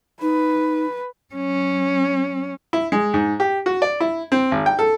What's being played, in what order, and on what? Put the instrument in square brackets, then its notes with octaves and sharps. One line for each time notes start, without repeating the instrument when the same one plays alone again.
[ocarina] D#4 [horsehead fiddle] B4
[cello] F#3 C#4
[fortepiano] E4
G#3
G#2
G4
F#4
D5
E4
C4
G#1
G5
A4